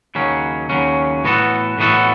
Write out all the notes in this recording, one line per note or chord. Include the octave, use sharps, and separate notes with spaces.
D#2 C#3 F#3 C#4
D#2 C#3 F#3 C#4
A2 E3 B3 F#4 A4
A2 E3 B3 F#4 A4